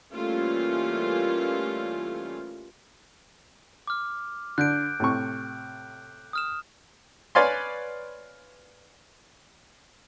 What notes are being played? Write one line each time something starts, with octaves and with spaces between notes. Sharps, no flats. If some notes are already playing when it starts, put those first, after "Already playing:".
E3 G3 A3 A#3 C#4 F4
D6 F6
D3 F#6 G6 D7
A2 C3 C#6
D#6 F6 E7
B4 C#5 D5 F5 G#5 C6